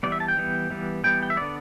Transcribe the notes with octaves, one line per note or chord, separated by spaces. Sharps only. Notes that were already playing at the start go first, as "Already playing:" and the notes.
E3 G3 B3 D5
E5
A5
G5
E3 G3 B3
E3 G3 B3
E3 G3 B3 G5
G5
E5
D3 B3 D5